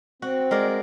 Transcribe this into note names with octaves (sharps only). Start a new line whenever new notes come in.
C4 F#4
G#3 A#4 D5